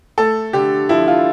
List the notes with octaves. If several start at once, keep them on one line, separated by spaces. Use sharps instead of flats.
A3 A4
D3 G4
F3 E4
F4